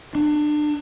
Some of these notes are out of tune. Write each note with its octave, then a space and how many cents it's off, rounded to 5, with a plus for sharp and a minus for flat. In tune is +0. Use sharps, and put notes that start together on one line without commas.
D4 +30